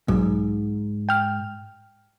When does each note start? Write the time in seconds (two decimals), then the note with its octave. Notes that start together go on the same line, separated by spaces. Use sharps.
0.08 B1 G#2 F#3
1.09 G5 F6